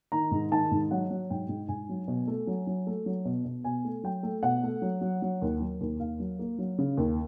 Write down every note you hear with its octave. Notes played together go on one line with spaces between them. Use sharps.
D#3 A#5
G#2
D#3 A5
G#2
F#3 F#5
F#3
G#2 G5
G#2
G#2 G#5
F#3
B2
A3
F#3
F#3
A3
F#3
B2
B2
B2 G#5
A3
F#3 G5
A3
B2 F#5
A3
F#3
F#3
F#3
D#2
F#3
D#2
D#2 F5
F#3
A#3
F#3
C#3
D#2